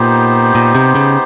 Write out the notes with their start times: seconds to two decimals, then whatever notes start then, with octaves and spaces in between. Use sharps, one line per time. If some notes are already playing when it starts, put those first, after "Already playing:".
Already playing: A#2 B3 D#4 G4 C5
0.55 A#2
0.75 C3
0.95 C#3